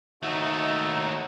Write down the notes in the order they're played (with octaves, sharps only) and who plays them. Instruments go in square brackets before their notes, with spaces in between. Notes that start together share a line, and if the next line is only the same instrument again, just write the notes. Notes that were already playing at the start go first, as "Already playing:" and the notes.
[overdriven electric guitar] D#2 A3 [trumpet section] D#4 [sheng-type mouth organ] F#4 E5